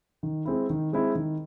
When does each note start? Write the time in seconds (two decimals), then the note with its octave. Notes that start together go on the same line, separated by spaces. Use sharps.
0.23 D#3
0.45 G#3 C4 E4
0.70 D#3
0.93 G#3 C4 E4
1.15 D#3